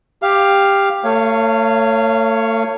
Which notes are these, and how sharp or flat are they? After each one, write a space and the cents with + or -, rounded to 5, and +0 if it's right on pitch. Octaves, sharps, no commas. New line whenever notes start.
G4 +10 F5 +0
A3 +35 C#5 +0 F5 -15